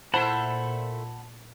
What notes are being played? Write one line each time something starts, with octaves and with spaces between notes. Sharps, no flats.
A#2 A3 E4 C5 F#5 A5 B5